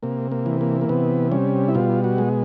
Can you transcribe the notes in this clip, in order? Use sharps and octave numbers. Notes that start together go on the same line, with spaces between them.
C3 A#3
A#3
E3
A#3
A#3
C3 B3
G3 C#4
E4
B2 F4
F#4
G#3